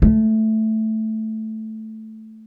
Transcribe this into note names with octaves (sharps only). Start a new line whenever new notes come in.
A3